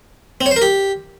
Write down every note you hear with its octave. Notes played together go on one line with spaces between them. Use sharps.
C4
C#5
C5
A#4
G4